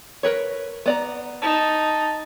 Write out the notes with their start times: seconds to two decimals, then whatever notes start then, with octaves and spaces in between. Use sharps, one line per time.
0.23 A#4 B4 C#5
0.86 B3 D5 A#5
1.42 D#4 A5